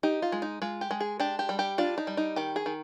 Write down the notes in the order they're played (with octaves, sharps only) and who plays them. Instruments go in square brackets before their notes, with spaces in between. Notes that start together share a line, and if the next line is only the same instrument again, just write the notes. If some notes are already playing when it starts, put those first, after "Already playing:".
[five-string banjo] D#4 G4
F4
G#3
D#4
G#3 F4
G4
G#3
G#4
D4 G4
G4
G3
G4
D4 F4
D#4
G3
D#4
D#3 G4
G#4
D#3